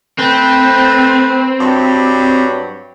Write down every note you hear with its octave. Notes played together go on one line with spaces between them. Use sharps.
A3 C4 B4 G5
G2 F#3 G4